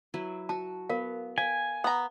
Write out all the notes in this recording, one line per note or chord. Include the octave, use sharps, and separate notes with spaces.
F#3 E4 B4
F#4 A5
B3 A#4 F5
F5 G5 G#5
B3 A#5